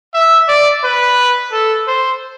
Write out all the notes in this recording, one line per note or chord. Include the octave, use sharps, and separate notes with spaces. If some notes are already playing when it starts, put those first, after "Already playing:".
E5
D5
B4
A4
C5